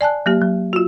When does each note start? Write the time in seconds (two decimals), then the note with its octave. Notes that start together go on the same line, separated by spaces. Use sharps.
0.01 D5 G#5 A5 F#6
0.26 F#3 A#3 G4
0.41 F#3
0.73 F4 F#4